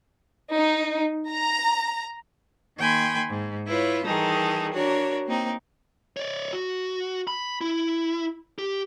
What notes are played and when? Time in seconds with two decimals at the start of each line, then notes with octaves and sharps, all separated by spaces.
0.54 D#4
1.28 A#5
2.79 D#3 A#3 G5 G#5 B5 C6
3.31 G#2
3.67 E4 F4 B4 C#5
4.05 D#3 E3 G3 D#4 G#4 A4
4.73 D4 F#4 A#4 C#5
5.27 A#3 C4 D#4
6.17 C#5 D5
6.53 F#4
7.27 B5
7.61 E4
8.59 G4